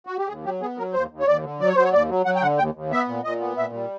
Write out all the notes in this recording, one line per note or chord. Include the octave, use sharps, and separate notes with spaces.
F#4
G4
D#2 G#4
F#3 G4
B3 G#4
F#3 A#4
D#2 C5
D#2
C#5
D#2 D5
D3
F#3 D5
C#5
F#3 C5
C#5
D#2 D5
F#3
F#3 F#5
G5
D3 F#5
D#2 G5
D#2
B3 E5
A#2
A#2 D#5
B3
A#2 E5
G3